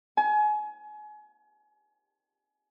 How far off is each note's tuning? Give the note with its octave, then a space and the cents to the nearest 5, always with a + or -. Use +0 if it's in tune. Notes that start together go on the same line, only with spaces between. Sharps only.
G#5 +30